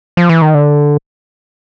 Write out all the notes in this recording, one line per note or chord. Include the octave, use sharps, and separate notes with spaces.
F3
E3
D#3
D3